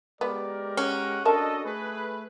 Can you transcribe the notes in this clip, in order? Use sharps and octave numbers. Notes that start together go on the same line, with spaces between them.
G#3 B3 G4 A#4 D5
C#4 F#5
D4 F#4 A4 A#4 D#5 A5
A3 G#4 B4